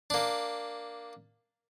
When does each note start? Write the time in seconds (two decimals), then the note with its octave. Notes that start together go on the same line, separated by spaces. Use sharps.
0.10 A#3 D4